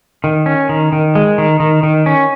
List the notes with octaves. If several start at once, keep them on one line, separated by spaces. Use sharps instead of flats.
D#3
C#4
D#3
D#3
G#3
D#3
D#3
D#3
C#4